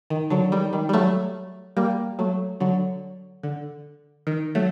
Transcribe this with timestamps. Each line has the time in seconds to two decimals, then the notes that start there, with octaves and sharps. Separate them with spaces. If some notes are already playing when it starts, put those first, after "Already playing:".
0.10 D#3
0.30 D3 F#3
0.52 D#3 G3
0.73 D#3 G3
0.89 G3
0.93 F#3 A3
1.77 G3 A#3
2.19 F#3 A3
2.60 D3 F#3
3.43 D3
4.27 D#3
4.55 F#3 A3